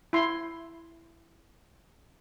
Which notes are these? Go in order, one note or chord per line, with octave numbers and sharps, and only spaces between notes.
E4 C6